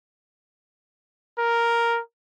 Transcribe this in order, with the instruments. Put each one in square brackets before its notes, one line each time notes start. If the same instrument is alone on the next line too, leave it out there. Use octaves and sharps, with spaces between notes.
[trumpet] A#4